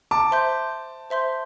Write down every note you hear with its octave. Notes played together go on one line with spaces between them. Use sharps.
A5 D6
C5 E5 C6 G6
C5 E5 C6 G6